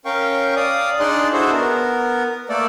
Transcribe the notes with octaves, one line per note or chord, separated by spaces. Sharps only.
C#4 A#4 F5 G5 C#6
D5 F5 D#6
D4 D#4 G#4 D5 C6 F#6
D4 E4 F#4 G#4 A4 C5
B3 A#4
A3 A#3 A4 D5